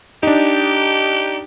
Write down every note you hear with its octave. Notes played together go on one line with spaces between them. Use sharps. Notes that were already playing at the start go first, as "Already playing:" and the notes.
D4 D#4 G4